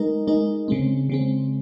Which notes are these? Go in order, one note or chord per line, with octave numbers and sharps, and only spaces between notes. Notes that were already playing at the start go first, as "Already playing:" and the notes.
Already playing: G#3 D#4 A#4
G#3 D#4 A#4
C#3 G#3 C4
C#3 G#3 C4